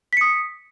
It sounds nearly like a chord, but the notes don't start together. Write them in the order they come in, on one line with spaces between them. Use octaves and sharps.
B6 C#7 D#6